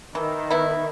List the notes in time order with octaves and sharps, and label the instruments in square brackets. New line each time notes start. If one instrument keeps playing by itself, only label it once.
[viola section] D#3 [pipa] E3
[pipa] B3 E4